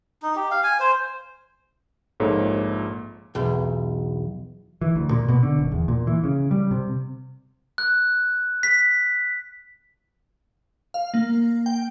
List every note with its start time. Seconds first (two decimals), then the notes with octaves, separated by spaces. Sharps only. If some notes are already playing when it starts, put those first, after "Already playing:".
0.22 D#4
0.36 G4
0.51 F5
0.64 G#5
0.80 C5
2.20 A#1 F2 G#2 A#3 A4 C#5
3.35 B1 E2
4.81 E3
4.95 D2
5.11 A#2
5.28 B2
5.43 D3
5.58 D#1
5.72 E2
5.88 A#2
6.07 E3
6.24 C#3
6.51 G3
6.71 C3
7.78 F#6
8.63 B6
10.94 F5
11.14 A#3
11.66 G5